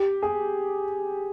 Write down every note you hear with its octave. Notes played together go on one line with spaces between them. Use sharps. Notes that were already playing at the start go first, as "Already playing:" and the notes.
Already playing: G4
G#4